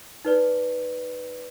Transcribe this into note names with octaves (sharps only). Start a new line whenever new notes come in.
D#4 B4 D5